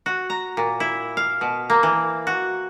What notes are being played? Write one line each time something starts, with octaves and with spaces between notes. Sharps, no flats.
F#4
A#5
A#2
E4
F5
B2
A#3
E3
F#4